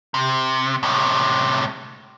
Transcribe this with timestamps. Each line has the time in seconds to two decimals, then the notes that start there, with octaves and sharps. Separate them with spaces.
0.14 C3
0.83 A2 C3